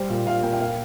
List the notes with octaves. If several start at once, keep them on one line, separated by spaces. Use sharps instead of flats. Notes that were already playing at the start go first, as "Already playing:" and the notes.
Already playing: G3 C5
A#2
A#2 F5
A#3 G5
G5
A#3 F5